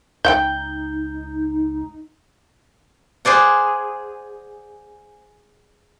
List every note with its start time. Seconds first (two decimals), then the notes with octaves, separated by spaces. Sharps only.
0.25 C#2 D#4 E5 F#5 G5 G6
3.25 G#4 C5 D5 F#5